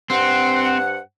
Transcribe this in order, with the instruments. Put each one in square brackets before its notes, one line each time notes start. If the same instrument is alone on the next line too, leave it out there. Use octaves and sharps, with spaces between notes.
[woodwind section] G2 C5 F#5 [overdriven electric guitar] C4